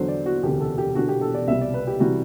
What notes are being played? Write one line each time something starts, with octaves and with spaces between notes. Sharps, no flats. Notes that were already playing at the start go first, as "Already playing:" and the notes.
Already playing: E2 D3 F#3 C5
D5
F#4
E1 D2 C3 G4
A4
G4
E1 E2 D3 F#4
G4
A4
D5
C2 B2 G3 E5
D5
B4
G4
C3 E3 G3 F#4